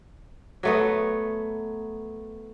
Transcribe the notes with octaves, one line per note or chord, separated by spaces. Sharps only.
F#3 A3 B3